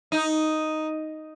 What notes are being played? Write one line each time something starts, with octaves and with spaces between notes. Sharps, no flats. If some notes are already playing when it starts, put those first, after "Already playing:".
D#4